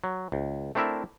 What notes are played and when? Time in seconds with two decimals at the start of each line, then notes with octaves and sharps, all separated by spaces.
0.04 F#3
0.32 C#2
0.75 A3 C4 D4 E4 A#4 E5